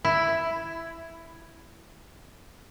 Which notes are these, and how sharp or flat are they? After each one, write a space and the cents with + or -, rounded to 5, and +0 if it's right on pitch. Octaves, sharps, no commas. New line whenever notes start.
E4 +5